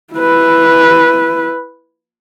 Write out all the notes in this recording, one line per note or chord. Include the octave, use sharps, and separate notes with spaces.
E4 B4